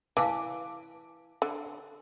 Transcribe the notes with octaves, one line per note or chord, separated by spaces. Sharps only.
E3 F5 A5 D6
D3